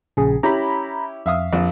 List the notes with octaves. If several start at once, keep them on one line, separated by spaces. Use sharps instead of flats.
A#1 C#3 G#4
C#4 E4 G4 A#5 B5
F2 E5 F5 D#6
A#1 F2 F3